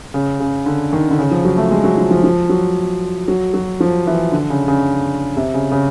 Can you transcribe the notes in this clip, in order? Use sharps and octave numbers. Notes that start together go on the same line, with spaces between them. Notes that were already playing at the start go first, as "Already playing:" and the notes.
C#3
C#3
D3
D#3
D3
C#3
F3
F#3
A3
G#3
F#3
F3
F3
F3
F#3
F#3
F#3
F3
E3
D3
C#3
C#3
C3
C#3
C#3